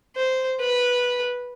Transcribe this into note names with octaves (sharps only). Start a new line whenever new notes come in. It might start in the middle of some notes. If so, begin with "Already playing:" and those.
C5
B4